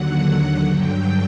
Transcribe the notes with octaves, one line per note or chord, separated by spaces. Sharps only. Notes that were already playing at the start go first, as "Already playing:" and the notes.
Already playing: D#2 D3 F#3 F#5
G2 D3 F#3 G5